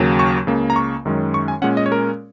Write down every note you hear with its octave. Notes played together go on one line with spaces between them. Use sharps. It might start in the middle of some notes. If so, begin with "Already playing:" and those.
Already playing: D#2 C#3 F#3 A#3
C#6
C#2 C#3 A#3
A#5
C#6
F#2 D#3 G#3 C#4
C#6
G#5
A#2 G#3 C#4 F#5
D#5
C#5
A#4